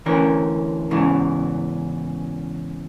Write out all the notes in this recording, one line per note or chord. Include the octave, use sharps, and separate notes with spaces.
D2 E3 C#4 A#4
E2 G#2 C#3 E3